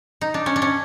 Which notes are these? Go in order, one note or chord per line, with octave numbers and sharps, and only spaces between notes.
D#4
D4
C#4
D4
C#4